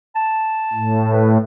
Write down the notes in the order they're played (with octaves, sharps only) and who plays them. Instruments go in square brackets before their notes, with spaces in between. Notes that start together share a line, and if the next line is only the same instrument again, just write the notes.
[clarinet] A5
[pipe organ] A2
[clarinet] B4